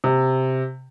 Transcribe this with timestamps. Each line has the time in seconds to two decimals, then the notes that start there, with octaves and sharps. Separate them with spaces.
0.04 C3